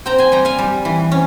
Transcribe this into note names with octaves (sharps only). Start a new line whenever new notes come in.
C4 G5 A#5
G#5 C6
G3 G5 A#5
F5 G#5
G3
E3
C#4